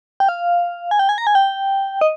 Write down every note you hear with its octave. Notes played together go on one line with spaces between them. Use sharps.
G5
F5
G#5
G5
G#5
A#5
G#5
G5
D#5